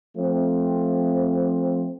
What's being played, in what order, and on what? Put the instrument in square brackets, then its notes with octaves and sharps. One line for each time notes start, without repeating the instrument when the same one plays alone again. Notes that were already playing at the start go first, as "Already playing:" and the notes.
[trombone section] F3 A3 C4